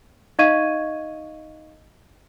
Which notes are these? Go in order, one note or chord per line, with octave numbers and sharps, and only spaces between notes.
D#4 D#5 F5 C#6 G#6 D#7